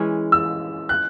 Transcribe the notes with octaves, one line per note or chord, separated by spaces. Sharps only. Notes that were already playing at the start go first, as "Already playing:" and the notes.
Already playing: E3 G#3 C#4
E6
F#6